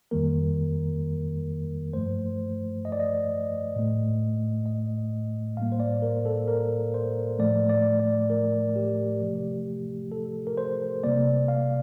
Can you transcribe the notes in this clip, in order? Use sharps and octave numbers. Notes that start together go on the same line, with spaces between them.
F2 D#3 G3 A#3 A#4
G2 F3 A3 C5
D#5
D5
D#5
A2 A3
D#5
A2 G3 A#3 F5
C5
D5
A#4
A4
A#4
C5
A2 F3 A3 D5
D5
D5
A#4
G4
C3 F3 A3
A4
A#4
C5
C3 G3 A#3 D5
F5